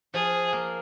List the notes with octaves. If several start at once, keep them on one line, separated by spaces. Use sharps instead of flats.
F3 G#4
A#3